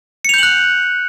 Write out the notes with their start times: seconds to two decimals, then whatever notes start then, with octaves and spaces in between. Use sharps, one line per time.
0.25 C#7
0.29 F7
0.34 G6
0.38 F#7
0.43 F#6